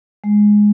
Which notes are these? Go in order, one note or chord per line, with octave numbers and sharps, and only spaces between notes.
G#3